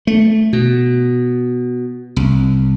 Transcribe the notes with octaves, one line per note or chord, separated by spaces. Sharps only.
A3
B2
C2